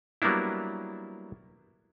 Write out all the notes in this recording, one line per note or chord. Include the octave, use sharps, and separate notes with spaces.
F#3 G3 A#3 B3 D4 E4